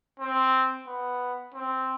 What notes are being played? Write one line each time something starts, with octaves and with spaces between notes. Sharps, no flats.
C4
B3
C4